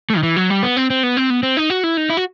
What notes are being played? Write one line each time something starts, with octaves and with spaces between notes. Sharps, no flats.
A3
D#3
E3
F#3
G3
B3
C4
C4
B3
C4
B3
C4
D#4
F#4
E4
D#4
E4
F#4